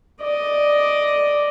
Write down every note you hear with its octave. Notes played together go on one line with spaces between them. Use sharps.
D5 D#5